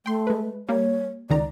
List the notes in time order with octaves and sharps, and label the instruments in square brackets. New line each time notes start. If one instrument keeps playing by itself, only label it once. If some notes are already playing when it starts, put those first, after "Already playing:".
[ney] A3 [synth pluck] G5 C6
[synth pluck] G#3 B4
[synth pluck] G3 A#3 [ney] C#5
[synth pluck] C#2 D#3 A#5 [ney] D5